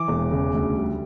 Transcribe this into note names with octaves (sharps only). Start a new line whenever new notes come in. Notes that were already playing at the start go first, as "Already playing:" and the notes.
Already playing: E3 D6
E1
C#3
D2
G3